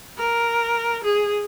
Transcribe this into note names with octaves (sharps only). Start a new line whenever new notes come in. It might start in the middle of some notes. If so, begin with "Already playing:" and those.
A#4
G#4